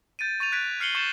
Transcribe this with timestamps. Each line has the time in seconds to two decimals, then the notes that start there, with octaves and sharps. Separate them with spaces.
0.19 G6 A6 D7 D#7
0.40 C#6 A6 D#7 F7
0.52 F#6 G#6 B6 D7
0.80 F6 C7 C#7 F#7 G7
0.95 C#6 G6 A6 C#7 E7